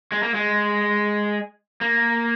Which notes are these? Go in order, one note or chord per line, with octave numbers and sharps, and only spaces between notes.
G#3
A#3
G#3
A#3